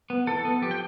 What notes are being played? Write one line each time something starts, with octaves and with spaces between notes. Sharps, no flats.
B3
E3 A4
B3
F3 G4
G5